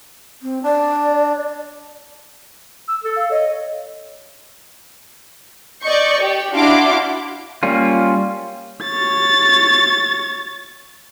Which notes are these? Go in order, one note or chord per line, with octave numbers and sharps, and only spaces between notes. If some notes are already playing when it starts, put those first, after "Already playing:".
C4
D4 D5
E6
A4
F5
C#5 D#5
D5 D#5 C#6 G6
G4
D4 E4 F#4 F5 C6 D6
G3 A#3 C#4 F4
C#5 A6